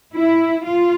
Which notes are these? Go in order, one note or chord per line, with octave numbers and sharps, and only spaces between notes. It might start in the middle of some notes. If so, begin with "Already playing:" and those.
E4
F4